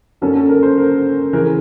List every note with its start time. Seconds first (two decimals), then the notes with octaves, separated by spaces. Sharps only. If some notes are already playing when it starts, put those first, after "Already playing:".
0.21 F#2 D3 F#3 A#3 C#4 A4
0.36 A4
0.49 A#4
0.63 C5
0.78 A#4
1.33 C#3 E3 A#4